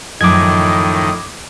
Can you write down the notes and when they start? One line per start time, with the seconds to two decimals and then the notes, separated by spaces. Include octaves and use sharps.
0.21 F#2 A2 D#3 F3 D#5 D6 G#6